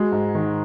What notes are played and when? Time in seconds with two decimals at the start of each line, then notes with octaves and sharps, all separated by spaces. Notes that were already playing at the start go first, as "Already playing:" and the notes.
Already playing: G#3 F#4
0.12 G#2
0.35 D#3